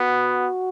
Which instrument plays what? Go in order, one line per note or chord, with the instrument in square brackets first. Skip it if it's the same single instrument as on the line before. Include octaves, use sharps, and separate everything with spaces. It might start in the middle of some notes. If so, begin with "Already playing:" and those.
Already playing: [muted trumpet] B3 [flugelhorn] F#4